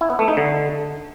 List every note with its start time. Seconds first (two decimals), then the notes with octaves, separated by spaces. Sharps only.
0.01 E4
0.10 B3
0.19 A3
0.28 D#4
0.37 D3